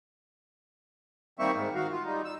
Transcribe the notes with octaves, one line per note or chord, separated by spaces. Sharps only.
D#3 G3 A#3 C4 E5 C#6
G#2 D#3
D#3 F#4 F5
F4
G3 D#4
E6